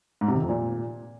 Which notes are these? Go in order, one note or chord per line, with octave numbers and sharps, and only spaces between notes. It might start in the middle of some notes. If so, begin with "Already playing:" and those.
G#2
C3
D#3
F2
A#2